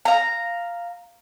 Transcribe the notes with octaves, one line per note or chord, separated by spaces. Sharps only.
F5 A#5